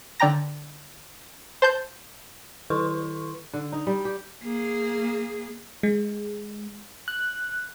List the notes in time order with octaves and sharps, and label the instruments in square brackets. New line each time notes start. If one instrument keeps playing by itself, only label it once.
[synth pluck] D3 D5 G5 A#5 A#6
C5 A5 G6
[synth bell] D#3 E4 A4 B4 C6 C#6
[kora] D3
D#4
G3
G4
[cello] A#3 G#4
[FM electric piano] G#3
F#6